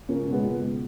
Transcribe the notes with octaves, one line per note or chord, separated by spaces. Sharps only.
C#2 A#3 C#4
B2
G#3 B3
C#2
B2